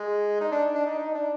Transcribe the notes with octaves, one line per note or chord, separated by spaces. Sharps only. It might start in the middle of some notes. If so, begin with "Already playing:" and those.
Already playing: G#3
D#4
D4
D4
D#4
D#4
D4